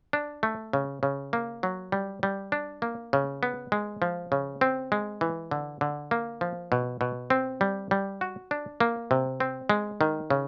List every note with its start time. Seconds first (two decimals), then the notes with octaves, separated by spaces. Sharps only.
0.13 D4
0.43 A3
0.73 C#3
1.03 C#3
1.33 A#3
1.63 F#3
1.92 G3
2.23 G3
2.52 D4
2.82 A#3
3.13 C#3
3.43 B3
3.72 G#3
4.02 F3
4.32 C#3
4.61 C4
4.92 G#3
5.21 E3
5.51 D3
5.81 D3
6.11 A#3
6.41 F3
6.72 B2
7.01 B2
7.30 C4
7.61 G3
7.91 G3
8.21 F#4
8.51 D4
8.80 A#3
9.11 C3
9.40 C4
9.70 G#3
10.01 D#3
10.30 C#3